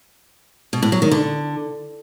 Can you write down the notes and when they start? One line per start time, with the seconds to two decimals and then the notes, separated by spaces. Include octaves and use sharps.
0.73 B2
0.83 A2
0.92 F#3
1.02 D#3
1.11 D3